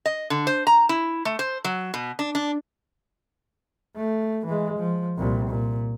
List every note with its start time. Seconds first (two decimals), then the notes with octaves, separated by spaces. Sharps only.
0.06 D#5
0.30 D3
0.47 C5
0.67 A#5
0.89 E4
1.25 A3
1.39 C5
1.64 F#3
1.94 B2
2.19 D4
2.35 D4
3.96 A3
4.46 E3 G#3
4.77 F3
5.18 C2 A#2
5.48 A#2